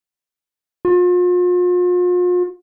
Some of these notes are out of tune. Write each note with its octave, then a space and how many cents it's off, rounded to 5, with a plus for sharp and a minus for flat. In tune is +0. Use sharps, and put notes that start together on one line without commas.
F4 +40